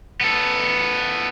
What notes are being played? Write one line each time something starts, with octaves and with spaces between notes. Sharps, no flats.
B3 A4